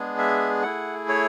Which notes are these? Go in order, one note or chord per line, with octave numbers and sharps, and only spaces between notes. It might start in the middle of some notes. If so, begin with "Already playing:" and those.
Already playing: G#3 B3 D4 G#4
E5
A3 E4 G#4 F#5
C#5